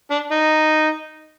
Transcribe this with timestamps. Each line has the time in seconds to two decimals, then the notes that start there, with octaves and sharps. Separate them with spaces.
0.11 D4
0.31 D#4